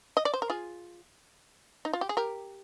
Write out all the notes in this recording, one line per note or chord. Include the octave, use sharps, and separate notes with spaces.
D#5
D5
C5
A#4
F4 G#4
D#4
F4
G4
G#4
G4 A#4